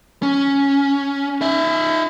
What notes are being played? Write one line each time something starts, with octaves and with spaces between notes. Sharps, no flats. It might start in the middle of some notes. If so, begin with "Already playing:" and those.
C#4
D#4 E5